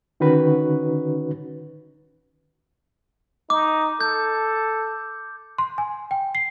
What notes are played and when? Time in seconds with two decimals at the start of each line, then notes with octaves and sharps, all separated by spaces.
0.20 D3 D#3 C#4 D#4 F#4 B4
3.50 D#4 D6
4.01 A4 G6
5.58 C6
5.78 G#5
6.11 G5
6.35 C7